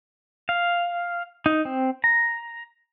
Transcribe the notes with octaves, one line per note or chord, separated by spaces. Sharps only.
F5
D#4
C4
A#5